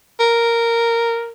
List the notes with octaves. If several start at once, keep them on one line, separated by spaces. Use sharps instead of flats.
A#4